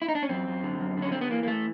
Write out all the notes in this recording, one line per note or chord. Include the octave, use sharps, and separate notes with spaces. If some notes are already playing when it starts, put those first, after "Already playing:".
E4
D#4
D4
C#4
F#2 C4
F#2
D3
F#2
D3 C#4
D3 C4
B3
E3 A#3
A#3
A3